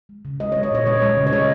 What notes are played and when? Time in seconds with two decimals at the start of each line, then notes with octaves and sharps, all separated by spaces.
0.09 G#3
0.25 C#3
0.40 G#3 D#5
0.52 C#5
0.56 G#3
0.63 D#5
0.71 A#2 C#5
0.87 G#3 C#5
1.02 G#3
1.17 C#3
1.27 C#5
1.33 G#3 D#5